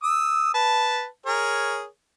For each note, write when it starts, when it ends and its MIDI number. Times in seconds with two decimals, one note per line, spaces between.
0.03 0.51 87
0.03 0.51 88
0.54 1.06 71
0.54 1.06 81
1.26 1.85 68
1.26 1.85 70
1.26 1.85 73